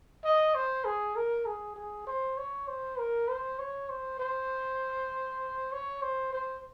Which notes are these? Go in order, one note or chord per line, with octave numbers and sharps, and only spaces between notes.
D#5
C5
G#4
A#4
G#4
G#4
C5
C#5
C5
A#4
C5
C#5
C5
C5
C#5
C5
C5